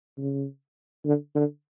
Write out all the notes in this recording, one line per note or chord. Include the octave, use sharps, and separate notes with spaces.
C#3
D3
D3